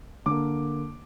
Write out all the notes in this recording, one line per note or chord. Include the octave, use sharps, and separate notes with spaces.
D3 A#3 D6